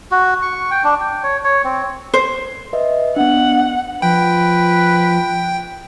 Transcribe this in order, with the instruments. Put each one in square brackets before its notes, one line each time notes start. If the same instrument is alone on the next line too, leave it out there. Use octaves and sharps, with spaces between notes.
[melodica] F#4
C#6
G5
D4
G5
C#5
C#5
C4
[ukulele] C5
[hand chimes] B4 D#5 E5
[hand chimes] B3 D4 [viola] F#5
[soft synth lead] F3 [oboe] B4 [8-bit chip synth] G5